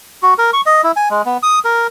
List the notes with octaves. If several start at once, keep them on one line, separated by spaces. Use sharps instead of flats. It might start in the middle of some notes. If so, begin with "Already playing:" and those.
F#4
A#4
C#6
D#5
E4
G#5
G#3
B3
D#6
A#4